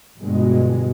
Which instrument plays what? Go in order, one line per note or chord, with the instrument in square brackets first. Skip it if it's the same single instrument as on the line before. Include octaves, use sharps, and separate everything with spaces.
[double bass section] G1 G2 B2 G#3